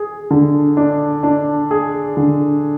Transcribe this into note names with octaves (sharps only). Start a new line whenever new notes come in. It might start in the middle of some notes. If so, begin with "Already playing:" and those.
Already playing: G#4
D3
D4
D4
G#4
D3